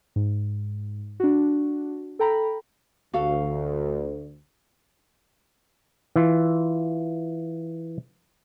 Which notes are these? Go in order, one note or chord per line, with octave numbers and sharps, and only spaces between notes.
G#2
D4 F#4
A4 G5 A#5 B5
D2 F#4 A4 F5
E3 F4